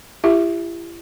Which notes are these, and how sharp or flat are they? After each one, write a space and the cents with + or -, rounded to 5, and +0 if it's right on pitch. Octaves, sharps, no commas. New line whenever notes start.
E4 +40 G4 +20 E5 +0